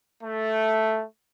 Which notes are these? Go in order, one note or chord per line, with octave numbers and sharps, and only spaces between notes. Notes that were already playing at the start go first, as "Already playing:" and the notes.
A3